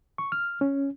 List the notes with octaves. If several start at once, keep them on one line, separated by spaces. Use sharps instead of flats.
C#6
F6
C#4